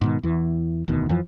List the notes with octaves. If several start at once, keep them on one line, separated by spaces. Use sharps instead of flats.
G#2 B2 D#3
E2 E3
E1 D2 B2 D#3
F2 E3 F3